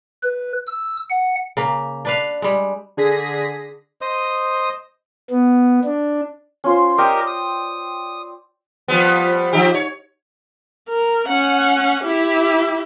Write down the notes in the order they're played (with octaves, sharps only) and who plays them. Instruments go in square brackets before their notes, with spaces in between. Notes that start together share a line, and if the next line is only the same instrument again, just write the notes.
[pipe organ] B4
E6
F#5
[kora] C#3 A#3
D4 B4 F5
G3 G#3
[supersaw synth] D3 G#4 A#6 B6
[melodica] C5 D#5 D#6
[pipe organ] B3
D4
[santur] C#4 F4 C5
[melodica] G4 A#4 D#5 [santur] D5 G5 E6
[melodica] D#6
[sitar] F3 G3 B3
F3 D#4 G4
C#5
[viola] A#4
C#4 F#5
E4 G4